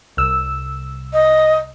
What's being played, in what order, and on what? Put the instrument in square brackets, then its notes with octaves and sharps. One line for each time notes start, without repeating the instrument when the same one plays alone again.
[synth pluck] C2 E6
[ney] D#5